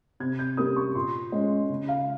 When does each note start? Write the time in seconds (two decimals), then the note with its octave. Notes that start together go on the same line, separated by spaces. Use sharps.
0.20 C3 G#6
0.39 G6
0.57 G3 A#3 C#4 D#6
0.76 C#6
0.95 A#2 C6
1.32 G#3 C#4
1.69 C#3
1.88 F5